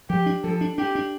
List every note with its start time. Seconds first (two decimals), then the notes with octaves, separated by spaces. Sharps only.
0.09 F3 G4
0.26 D4
0.43 F3 A4
0.61 D4
0.78 D4 G4
0.95 D4